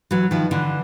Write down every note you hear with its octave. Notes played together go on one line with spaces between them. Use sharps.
E3 F#3
D#3 F3
D3 E3